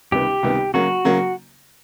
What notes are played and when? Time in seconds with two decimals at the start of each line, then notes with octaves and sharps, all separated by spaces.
0.12 C#2 C3 D#3 G3 B3 G4
0.43 C#2 C3 D#3 G3 B3
0.74 C#3 F#3 A#3 F#4
1.05 C#3 F#3 A#3